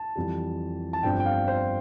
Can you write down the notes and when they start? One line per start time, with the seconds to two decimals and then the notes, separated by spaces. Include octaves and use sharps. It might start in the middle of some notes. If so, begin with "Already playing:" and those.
Already playing: A5
0.16 F2 E3 G3
0.93 A5
1.03 G1 G2 D3 F3 C4 G5
1.20 G5
1.25 F5
1.48 C5